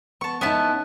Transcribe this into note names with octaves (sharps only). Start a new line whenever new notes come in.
B3 A5 C#6
B3 C#4 D#4 E4 A5